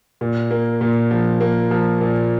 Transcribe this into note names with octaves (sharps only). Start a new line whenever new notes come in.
A#2
A#3
A#2
F3
A#3
F3
A#2